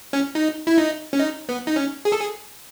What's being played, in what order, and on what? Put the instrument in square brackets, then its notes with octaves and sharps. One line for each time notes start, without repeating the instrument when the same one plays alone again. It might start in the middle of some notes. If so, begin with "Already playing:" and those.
[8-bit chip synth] C#4
D#4
E4
D#4
C#4
D#4
B3
D#4
C#4
G#4
A4
G#4